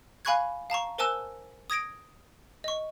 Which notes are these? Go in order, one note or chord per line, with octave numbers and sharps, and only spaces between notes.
F5 G#5 B5 C#6 F#6 G#6
F5 A5 A#5 C#6
A#4 C5 G#5 A5 E6 F#6
D#6 G#6 A#6 D7
D#5 C#6